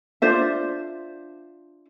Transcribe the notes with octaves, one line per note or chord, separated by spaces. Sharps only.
D4 F4 C5 E5